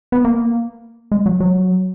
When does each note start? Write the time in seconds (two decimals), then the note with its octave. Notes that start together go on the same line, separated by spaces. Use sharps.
0.12 B3
0.25 A#3
1.12 G#3
1.26 F#3
1.40 F#3